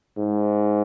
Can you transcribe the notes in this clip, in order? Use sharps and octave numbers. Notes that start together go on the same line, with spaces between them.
G#2